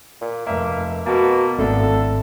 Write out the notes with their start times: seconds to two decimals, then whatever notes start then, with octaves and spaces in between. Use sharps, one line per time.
0.21 A#2
0.47 F1 A#3 E5
1.06 B2 A#3 A5
1.59 G#1 A2 D3 C4 A4